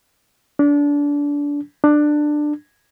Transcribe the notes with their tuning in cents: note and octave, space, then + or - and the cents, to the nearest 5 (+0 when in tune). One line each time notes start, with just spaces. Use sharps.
D4 -25
D4 +15